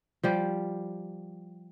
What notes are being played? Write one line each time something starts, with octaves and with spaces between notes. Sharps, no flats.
F3 G3 G4